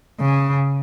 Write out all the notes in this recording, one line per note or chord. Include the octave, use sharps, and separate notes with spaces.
C#3